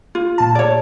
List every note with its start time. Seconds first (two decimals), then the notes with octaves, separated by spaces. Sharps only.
0.15 F4
0.38 A#2 A5
0.55 C#5 D5